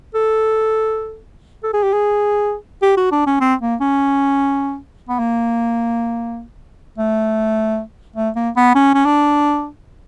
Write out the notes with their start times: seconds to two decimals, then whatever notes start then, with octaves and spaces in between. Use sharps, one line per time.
0.15 A4
1.64 A4
1.74 G#4
1.83 G4
1.94 G#4
2.82 G4
2.97 F#4
3.12 D4
3.27 C#4
3.41 C4
3.62 A#3
3.81 C#4
5.09 B3
5.19 A#3
6.98 A3
8.16 A3
8.36 A#3
8.57 B3
8.76 C#4
8.95 C#4
9.06 D4